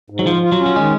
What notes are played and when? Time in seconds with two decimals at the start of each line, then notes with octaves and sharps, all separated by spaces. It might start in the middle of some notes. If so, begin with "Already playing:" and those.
0.10 G#2
0.19 F#3
0.27 F3 F4
0.43 F4
0.52 F#3
0.60 C#4
0.66 F#3
0.76 D#3 G#3